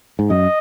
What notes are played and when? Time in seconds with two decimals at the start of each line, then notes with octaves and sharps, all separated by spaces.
0.19 G#2
0.30 F#2 D#5